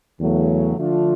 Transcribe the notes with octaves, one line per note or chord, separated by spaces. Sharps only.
E2 C#3 F#3 A3
D3 F3 A3 D4 F4